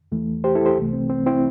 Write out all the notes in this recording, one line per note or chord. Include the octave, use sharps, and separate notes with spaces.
E2 E3 A3
G4 C5
E4 A4
G4 C5
C2 C3 E3 A3
C4
C4
C4 E4